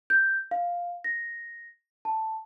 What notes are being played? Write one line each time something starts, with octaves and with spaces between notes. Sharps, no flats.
G6
F5
A#6
A5